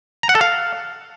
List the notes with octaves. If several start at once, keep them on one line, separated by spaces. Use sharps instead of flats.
A#5
F#5
A4
F5